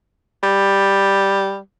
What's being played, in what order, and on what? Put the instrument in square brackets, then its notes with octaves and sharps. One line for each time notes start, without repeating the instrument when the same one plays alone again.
[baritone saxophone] G3